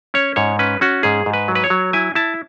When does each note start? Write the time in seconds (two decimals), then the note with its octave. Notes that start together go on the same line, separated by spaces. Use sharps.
0.14 C#4 C#5
0.36 G#2 C#5
0.59 C#4 B4
0.81 C#4 F#4
1.03 G#2 G#4
1.26 G#2
1.33 B4
1.48 F#3
1.55 B4
1.64 C#5
1.70 F#3
1.93 E4 G#5
2.15 E4 A5